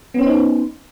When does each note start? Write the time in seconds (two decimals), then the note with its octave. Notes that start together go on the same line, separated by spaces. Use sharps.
0.14 B3
0.18 C#4
0.22 C5
0.26 D#4
0.30 B4